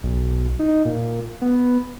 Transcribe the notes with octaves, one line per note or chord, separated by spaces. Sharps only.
B1
D#4
A#2
B3